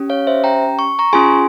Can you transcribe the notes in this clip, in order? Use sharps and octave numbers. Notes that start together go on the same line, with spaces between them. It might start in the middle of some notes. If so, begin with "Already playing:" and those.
Already playing: C#4 G4
C#5 F5
C5 E5
G5 A#5
C#6
A#5 C#6
C#4 F4 G#4 G#5 C6